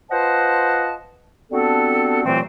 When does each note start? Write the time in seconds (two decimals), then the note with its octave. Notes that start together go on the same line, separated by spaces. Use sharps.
0.11 F4 B4 C5 D#5 F#5 A5
1.51 G3 B3 C4 D4 F#4 A4
2.25 C2 A#2 E3 F#3 A3 C4